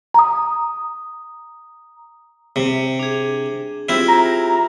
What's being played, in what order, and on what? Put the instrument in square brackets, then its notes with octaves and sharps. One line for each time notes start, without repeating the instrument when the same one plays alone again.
[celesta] A#5 D#6
[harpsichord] C3
[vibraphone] D4 G#4
[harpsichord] C4 E4 [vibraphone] F4 G4 G#4
[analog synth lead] A#5